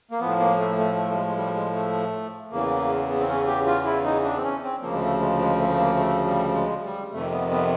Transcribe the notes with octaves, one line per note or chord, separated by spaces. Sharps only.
A#3
A2 F3 B3
A#3
A3
A3
A3
G3
G#3
G#3
G3
G#3
A3
E2 C#3 E3 A#3
B3
C4
C#4
G4
F4
E4
D#4
D4
C4
C#4
C4
D2 C#3 F3 A#3
G#3
A3
G#3
G#3
A3
A3
A#3
A3
G3
G#3
G3
F2 C3 D#3 A3
B3
B3